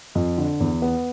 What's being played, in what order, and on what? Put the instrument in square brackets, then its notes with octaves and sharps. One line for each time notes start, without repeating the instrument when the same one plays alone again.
[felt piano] F2
D3
E2
B3